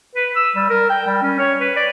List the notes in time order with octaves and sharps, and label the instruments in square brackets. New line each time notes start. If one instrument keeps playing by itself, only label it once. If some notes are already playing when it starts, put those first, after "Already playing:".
[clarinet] B4
E6
G3
A#4
G5
G3
C#4
C#5
B4
D5